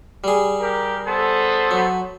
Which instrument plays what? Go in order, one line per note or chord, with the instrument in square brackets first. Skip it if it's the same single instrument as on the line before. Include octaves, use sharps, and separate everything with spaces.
[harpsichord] G3 G#4
[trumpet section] G4 A#4
B3 A4 C5
[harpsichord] F#3